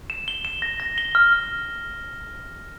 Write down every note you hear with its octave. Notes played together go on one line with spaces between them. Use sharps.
E7
G7
E7
A#6
A#6
G7
F6
F6